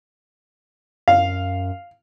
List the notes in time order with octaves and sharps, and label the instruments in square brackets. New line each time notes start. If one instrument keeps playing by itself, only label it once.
[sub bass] F#2 [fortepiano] F5